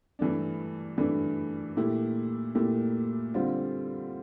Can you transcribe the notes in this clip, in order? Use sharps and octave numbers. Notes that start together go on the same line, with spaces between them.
G2 E3 A3 D4
G2 E3 A3 D4
A#2 A3 E4 G4
A#2 A3 E4 G4
D3 G3 C4 F4